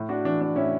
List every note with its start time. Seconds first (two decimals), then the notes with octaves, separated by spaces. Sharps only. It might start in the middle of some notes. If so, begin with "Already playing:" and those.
Already playing: A2
0.09 D4 F#4
0.25 E3 D4
0.41 D4
0.56 A2 C#4 E4